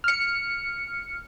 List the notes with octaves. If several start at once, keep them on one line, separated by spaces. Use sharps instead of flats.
F6 C#7